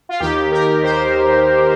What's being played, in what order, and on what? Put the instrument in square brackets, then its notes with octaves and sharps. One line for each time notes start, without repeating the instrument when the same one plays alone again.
[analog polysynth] F4
D#2 D#3 G4
A#4
D#3 C5